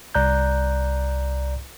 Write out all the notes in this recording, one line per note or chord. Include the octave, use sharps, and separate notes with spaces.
C2 D5 A#5 F#6 G6